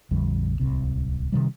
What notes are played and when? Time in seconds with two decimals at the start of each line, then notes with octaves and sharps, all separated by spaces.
0.11 A#1 F2 D3 G3
0.60 D1 C2 C3
1.32 C3 D#3 G3